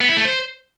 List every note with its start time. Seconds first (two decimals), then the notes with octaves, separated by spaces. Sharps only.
0.01 B3
0.09 E4
0.17 A3
0.25 C5